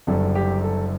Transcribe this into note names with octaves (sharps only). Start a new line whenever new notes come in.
F#1 F#2 D3 G3 A4
G4
A4